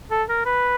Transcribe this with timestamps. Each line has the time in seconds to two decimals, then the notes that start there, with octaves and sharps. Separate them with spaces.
0.11 A4
0.29 A#4
0.46 B4